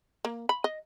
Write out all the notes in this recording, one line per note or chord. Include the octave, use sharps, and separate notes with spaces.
A#3
B5
D#5